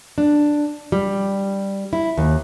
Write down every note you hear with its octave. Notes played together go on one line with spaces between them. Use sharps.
D4
G3
E4
D#2